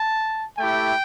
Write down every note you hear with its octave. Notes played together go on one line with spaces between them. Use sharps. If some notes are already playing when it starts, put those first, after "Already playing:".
Already playing: A5
A3 E4 G4 G5